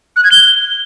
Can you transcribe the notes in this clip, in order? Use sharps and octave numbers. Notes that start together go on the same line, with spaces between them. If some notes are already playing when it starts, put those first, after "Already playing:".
F#6
G#6
G7